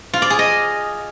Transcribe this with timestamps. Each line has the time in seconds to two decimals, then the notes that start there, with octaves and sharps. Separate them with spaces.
0.13 F4
0.22 D5
0.30 G#4
0.39 D#5